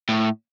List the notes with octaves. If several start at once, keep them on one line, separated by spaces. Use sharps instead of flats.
A2